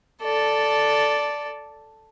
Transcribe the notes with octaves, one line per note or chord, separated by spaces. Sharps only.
A4 D5